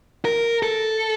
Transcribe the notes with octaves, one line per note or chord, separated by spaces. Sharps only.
A#4
A4